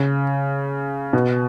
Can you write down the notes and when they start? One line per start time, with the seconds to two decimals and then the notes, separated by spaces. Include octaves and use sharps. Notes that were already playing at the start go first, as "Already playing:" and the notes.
Already playing: C#3
1.13 B2